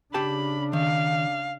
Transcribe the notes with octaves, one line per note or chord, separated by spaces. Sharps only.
C#3 D4 G4 A5 B5
D#3 F5